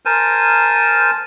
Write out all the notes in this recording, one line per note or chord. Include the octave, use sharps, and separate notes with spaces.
A#4 C5 G#5 A5